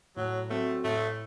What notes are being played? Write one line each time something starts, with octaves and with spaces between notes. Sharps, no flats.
A2 F#3
F#3 A3 C4 F#4 A4
A2 A3